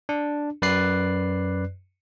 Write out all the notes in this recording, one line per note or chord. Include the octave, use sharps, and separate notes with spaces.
D4
F#2 B4 D5 F#6 C7